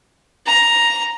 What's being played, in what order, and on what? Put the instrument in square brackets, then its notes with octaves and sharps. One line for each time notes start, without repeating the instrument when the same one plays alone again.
[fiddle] A#5